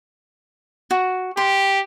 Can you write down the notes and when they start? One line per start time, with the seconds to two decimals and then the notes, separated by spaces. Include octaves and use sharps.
0.91 F#4
1.37 G4 C6